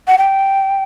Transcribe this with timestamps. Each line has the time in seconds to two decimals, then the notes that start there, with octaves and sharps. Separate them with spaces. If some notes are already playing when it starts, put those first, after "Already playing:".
0.07 F#5
0.18 G5